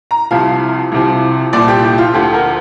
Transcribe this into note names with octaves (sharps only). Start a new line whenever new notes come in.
A#5
C2 C3 F3 F5
C2 C3 F3
C2 A#2 F3 D5
G4
G4
F4
D2 D3 F3 G4
A#4